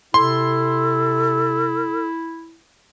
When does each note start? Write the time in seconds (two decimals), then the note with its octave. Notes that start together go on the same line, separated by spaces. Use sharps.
0.14 C3 E4 A4 C6